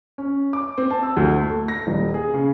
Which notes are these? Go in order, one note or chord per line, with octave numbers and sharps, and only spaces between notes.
C#4
D6
C4
A5
E6
D2
A3
A3
A#6
D#1
G#4
C#3